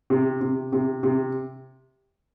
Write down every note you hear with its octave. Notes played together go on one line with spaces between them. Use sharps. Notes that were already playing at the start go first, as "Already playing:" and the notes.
C3
C3
C3
C3